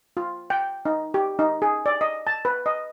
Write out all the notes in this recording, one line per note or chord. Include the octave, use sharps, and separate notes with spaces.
F4
G5
D#4
G4
D#4
G#4
D5
D#5
A5
B4
D#5